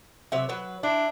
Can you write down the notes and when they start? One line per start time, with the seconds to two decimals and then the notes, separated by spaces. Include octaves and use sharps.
0.32 C3 F#3 E5
0.49 F#3 B4
0.83 D4 E4